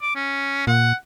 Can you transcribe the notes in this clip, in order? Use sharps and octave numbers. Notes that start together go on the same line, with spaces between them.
D6
C#4
A#2 F#5